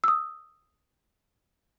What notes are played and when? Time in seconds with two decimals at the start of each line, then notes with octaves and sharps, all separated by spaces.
0.04 D#6 E6